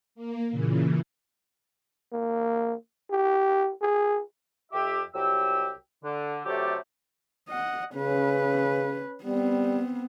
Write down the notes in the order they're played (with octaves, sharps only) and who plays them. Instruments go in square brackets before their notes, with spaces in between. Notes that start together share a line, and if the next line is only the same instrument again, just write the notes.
[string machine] A#3
A#2 C#3 E3
[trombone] A#3
G4
G#4
[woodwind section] F2 G4 E5
C2 F#3 G4 E6
D3
C3 F#3 A3 D4 G4 A4
[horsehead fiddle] D#5 F#5
[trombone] C#3 [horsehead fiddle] C#4 B4
[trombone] G3 [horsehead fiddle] B3 C4